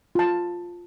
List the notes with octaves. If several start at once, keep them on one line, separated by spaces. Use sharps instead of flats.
F4 A5